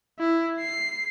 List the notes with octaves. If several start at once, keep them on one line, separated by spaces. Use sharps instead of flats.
E4
C7